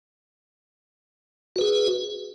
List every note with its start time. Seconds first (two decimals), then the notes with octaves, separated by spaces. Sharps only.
1.56 F#4
1.58 B4
1.61 G#4